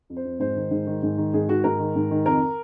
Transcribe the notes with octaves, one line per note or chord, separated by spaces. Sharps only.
F2
C5
F2
G#2 C5
D#3
G#2
D#3
G#2
D#3
G#2 G#4
D#3 F#4
G#2 A#4
D#3
G#2
D#3
F2 A#4